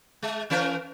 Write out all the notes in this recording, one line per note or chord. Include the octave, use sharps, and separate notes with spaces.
G#3
E3 C#4 A#4